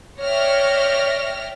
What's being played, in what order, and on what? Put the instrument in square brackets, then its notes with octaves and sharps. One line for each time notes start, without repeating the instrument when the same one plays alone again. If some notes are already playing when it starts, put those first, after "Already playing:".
[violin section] C#5 D5 E5 G5 F6 A#6